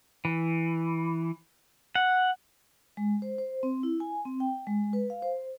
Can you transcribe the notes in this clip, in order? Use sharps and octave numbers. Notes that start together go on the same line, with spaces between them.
E3
F#5
G#3
C5
C5
C4
E4
G#5
C4
G5
G#3
B4
F5
C5